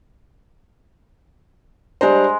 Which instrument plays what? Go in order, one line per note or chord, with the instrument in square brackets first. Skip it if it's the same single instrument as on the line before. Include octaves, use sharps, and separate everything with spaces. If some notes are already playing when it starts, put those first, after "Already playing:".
[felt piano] G3 D4 C5 [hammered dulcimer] G#3 A#5